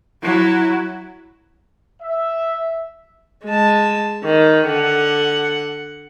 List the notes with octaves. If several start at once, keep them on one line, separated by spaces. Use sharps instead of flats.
F#3 E4
E5
G#3 A5
D#3
D3 F#5